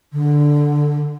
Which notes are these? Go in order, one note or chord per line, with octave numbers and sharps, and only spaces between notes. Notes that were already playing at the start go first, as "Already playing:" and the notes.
D3